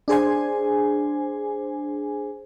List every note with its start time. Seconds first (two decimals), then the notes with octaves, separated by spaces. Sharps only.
0.08 D4 G#4 C5 G#5